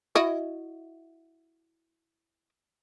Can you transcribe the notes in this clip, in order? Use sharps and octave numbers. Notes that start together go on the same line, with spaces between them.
E4 F#4 D#5